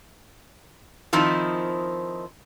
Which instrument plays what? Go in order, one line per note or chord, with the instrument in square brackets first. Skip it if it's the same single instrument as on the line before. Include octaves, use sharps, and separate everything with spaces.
[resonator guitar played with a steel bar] D#3 F3 C4 D#4 E4